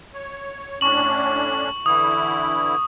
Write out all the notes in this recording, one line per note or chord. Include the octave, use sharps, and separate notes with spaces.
C#5
A2 C#4 D4 C#6 F#7
D3 E3 E4 D#6